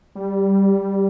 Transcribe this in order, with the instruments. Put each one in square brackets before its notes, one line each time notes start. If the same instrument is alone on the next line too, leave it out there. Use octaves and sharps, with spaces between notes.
[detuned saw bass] G3